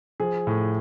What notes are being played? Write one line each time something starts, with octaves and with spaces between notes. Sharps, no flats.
F3 G#4
A2